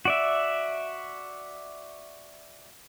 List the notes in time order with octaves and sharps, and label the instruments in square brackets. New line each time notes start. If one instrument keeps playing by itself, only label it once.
[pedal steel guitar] F#4 D5 E5